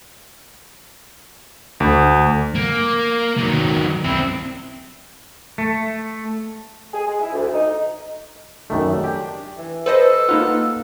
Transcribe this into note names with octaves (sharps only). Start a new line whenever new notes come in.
D2
A#3
D#3 F#3
C4 E4
A3
G#4
G#3
E4
D2
D#4
F#2 D#3 A3 D4
G4
E3
A4 B4 C5 D#5
A#3 D#4 F4 B4 F5 F#5